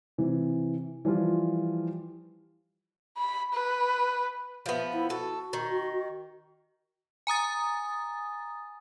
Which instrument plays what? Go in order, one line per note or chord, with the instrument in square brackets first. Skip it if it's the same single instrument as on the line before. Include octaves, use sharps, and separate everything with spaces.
[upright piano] C3 E3
E3 F3 G3 F4
[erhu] B5
B4
[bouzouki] F3 B3 [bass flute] E5
[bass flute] E4
[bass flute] F#4 [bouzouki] A4
[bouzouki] D#3
[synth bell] G#5 A#5 D#6 A6